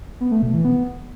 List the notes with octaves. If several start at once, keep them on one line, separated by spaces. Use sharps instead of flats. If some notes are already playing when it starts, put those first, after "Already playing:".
B3
A3
B2
E3
B3